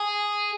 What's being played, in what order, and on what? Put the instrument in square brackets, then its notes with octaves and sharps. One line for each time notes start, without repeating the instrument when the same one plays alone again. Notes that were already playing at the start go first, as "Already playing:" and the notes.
Already playing: [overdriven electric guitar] G#4